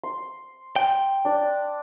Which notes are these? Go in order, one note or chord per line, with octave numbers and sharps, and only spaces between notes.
C6
G5
D4 D5